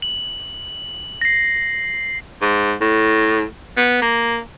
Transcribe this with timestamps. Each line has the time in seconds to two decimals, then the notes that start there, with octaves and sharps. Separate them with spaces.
0.02 F#7
1.21 A#6 C7
2.42 G#2
2.81 A2
3.77 B3
4.02 A#3